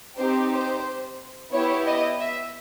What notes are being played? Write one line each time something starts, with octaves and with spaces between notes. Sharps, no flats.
C4 D#4 G4 C5
C5
B3 E4 G4 C#5
D#5
E5